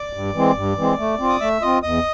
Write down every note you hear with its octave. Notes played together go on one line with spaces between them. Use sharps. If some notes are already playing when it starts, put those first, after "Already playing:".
Already playing: D5 D6
G2
E3 G#3 C4
G2
E3 G#3 C4
A3
C4 F4
D#6
A3 E5 E6
C4 F4 D#5 D#6
E2 D#5 D#6